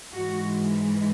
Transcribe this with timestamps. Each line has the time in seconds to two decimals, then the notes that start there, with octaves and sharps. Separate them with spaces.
0.15 G#2 E3 G#3 F#4